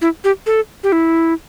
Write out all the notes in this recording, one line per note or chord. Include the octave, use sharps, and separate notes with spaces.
E4
G4
A4
G4
E4